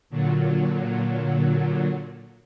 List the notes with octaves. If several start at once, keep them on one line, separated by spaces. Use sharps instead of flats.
A#2 D3 F#3